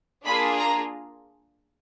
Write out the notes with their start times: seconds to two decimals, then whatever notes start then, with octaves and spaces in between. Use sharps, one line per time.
0.25 A#3 D4 F4 G#4 B5
0.59 A#5